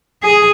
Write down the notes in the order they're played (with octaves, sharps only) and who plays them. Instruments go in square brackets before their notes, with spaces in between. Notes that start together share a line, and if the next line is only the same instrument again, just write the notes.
[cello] G#4